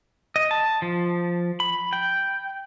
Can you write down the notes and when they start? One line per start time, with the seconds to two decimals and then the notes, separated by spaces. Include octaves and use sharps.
0.36 D#5
0.51 A5
0.82 F3
1.60 B5
1.93 G5